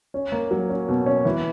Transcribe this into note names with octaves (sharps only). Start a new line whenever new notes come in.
C#4
A#3
F#3
C#4
B2
C#4
E3